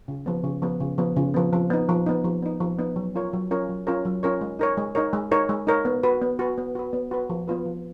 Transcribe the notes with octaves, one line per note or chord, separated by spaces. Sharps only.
C#3
F3 B3
C#3
F3 B3
C#3
F3 B3
C#3
F3 B3
F3
B3 D#4
F3
B3 D#4
F3
B3 D#4
F3
B3 D#4
F#3
C#4 F4 A#4 C#5
F#3
C#4 F4 A#4 C#5
F#3
C#4 F4 A#4 C#5
F#3
C#4 F4 A#4 C#5
G#3
D#4 A#4 C#5
G#3
D#4 A#4 C#5
G#3
D#4 A#4 C#5
G#3
D#4 A#4 C#5
B3
F#4 B4
B3
F#4 B4
B3
F#4 B4
B3
F#4 B4
F3
B3 F4 B4
F3